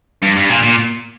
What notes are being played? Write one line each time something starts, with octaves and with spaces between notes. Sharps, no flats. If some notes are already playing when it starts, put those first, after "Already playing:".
G2
G2
A#2
A#2